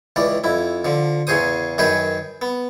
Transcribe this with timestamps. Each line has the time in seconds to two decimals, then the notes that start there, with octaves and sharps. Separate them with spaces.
0.16 C#2 E3 D5
0.44 F2 E4
0.85 D3 F3
1.27 E2 C#3 G#4 C5 D#6
1.78 F#2 D#3 G#4 B4 G5
2.42 B3